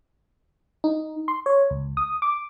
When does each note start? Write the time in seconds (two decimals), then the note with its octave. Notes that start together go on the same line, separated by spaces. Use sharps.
0.84 D#4
1.28 C6
1.46 C#5
1.70 C#2
1.97 D#6
2.22 D6